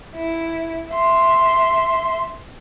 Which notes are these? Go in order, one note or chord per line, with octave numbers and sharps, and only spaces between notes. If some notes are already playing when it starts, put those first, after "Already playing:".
E4
E5 C6